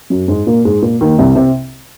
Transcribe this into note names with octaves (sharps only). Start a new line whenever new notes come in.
F#2 F#3
G#2 G#3
A#2 A#3
G#2 G#3
A#2 A#3
D#2 D#3
C2 C3
C3